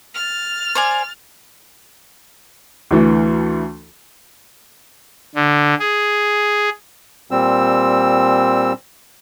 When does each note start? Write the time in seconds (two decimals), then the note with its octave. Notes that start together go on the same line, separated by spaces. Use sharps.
0.15 F6 A6
0.75 C5 D5 G#5
2.91 D2 E3 A3
5.35 D3
5.79 G#4
7.31 A#2 G3 C4 E6